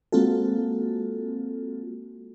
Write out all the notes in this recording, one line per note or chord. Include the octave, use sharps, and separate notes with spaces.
G#3 A#3 C4 F4 F#4 A4